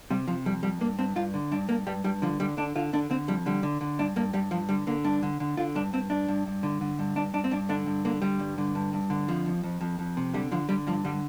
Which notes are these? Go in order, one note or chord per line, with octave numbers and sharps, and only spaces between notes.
C3 G3
C3 F3
F2 G3
F2 G3
G2 A#3
G2 C4
G2 F4
D3
G2 D4
G2 A#3
G2 G3
G2 G3
D3 F3
D3 G3
D3 D4
D3 F4
D3 D4
D3 C4
F2 G3
D3 G3
D3
D3
G2 D4
G2 A#3
G2 G3
G2 F3
D3 G3
D3 A#3
G2 D4
D3
D3
D3 F4
G2 D4
G2 C4
G2 D4
G2
G2
D3
D3
G2
G2 D4
G2 D4
C4
G2 D4
D3 D4
G2
D3 A#3
D3 G3
G2
D3
G2
G2
D3
F2 F3
F2
F2
F2
F2
C3
D3 G3
D3 F3
D3 G3
G2 F3
D3 G3